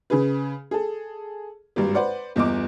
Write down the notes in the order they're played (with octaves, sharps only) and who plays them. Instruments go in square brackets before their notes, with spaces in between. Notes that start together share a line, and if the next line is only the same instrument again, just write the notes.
[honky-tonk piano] C#3 G#4 B4
G#4 A4
G#1 G2
B4 C5 D5 F#5
G1 E2 D#5 D6